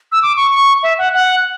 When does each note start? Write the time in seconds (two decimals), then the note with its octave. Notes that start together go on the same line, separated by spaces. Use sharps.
0.12 E6
0.22 D6
0.37 C#6
0.52 C#6
0.83 E5
0.98 F#5
1.14 F#5